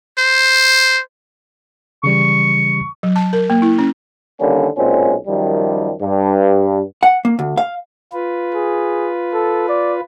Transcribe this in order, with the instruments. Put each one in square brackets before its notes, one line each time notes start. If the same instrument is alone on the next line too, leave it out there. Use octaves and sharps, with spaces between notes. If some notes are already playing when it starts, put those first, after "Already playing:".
[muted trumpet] C5
[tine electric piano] C#3 E3 G3 [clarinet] C#6
[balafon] F#3
A5
A#4
A#3
E4
C#4
[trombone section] D3 D#3 G3 A#3 C#4
B1 A#2 G#3 C4 C#4
F#2 D#3 F3 G3
G2
[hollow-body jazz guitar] F#5
A#3
D2
F5
[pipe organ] F4 B4
[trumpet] G#4
A4
D5